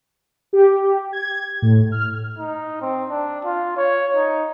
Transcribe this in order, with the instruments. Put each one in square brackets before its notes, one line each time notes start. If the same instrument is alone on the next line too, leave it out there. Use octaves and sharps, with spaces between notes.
[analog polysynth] G4
G#6
A2
F6
[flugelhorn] D#4
C4
D4
F4
C#5
D#4